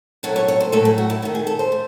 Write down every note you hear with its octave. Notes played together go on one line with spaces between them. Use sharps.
A2 F#3 A3 C#5
C#5
C#5
C5
A2 F#3 A3 A4
G#4
F#4
E4
D#3 A3 F#4
G#4
A4
C5
A3